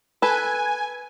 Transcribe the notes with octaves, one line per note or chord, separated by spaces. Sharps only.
A4 B4 G#5